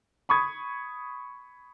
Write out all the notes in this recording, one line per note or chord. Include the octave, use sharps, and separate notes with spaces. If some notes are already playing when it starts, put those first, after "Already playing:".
B5 C#6 D#6 G#6